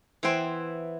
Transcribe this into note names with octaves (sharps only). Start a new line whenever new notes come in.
E3 B3 E4 C5 G5 C6